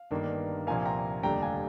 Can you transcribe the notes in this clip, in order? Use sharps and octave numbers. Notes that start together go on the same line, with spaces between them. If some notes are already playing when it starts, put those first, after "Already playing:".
Already playing: F5
G1 G2 D#3 A#3 D4
C2 A#2 F3 A#3 F5 G#5
G5 A#5
F1 D#2 D3 G3 D4 G5 A#5
F5 G#5